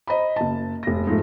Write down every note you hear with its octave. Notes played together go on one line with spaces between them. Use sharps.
C5 D#5 A#5 B5
F#1 A5
F1 A#6
G#2 F3 A3